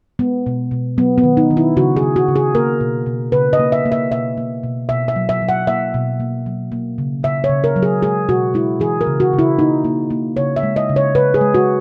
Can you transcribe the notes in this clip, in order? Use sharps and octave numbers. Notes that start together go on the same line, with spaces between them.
G#3 B3
B2
B2
F#3 B3
B3
D#3
D#4
D#3
E4
C#3 F#4
G#4
C#3
F#4
C#3
G#4
A#3 A#4
B2
B2
C#3 B4
D#5
A#3
E5
A#3
E5
B2 E5
A#3
B2
B2 E5
E5
F#3
E5
F#3
F#5
A#3 E5
B2
A#3
F#3
A#3
C#3
C#3 E5
C#5
C#3
A#4
F#3
G#4
G#3 G#4
B2 F#4
G#3 E4
E3 G#4
A#4
C#3
F#4
C#3
E4
A#3 D#4
A#3
A#3
C#3 C#5
E5
G#3
D#5
C#3
C#5
C#3 B4
G#4
G#3
F#4